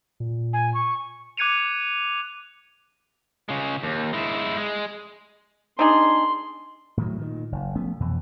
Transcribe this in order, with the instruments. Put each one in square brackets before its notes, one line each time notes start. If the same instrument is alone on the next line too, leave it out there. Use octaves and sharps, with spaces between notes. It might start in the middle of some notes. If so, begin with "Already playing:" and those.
[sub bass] A#2
[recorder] G#5
C#6
[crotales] D6 F#6 G#6 C#7 D#7 F7
[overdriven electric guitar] C#3 G#3
D#2
G#3 E4
G#3
[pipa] D4 D#4 G#4 [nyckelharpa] C6
[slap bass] A2 D#3 F#3
A#2 D#3
F#1
F3 A3 B3 C#4
F2 B2 E3